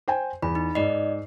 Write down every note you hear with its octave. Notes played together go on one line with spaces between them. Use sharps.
C5 G5 G#5
E2 B5
D#4
G#2 D5 D#5 C7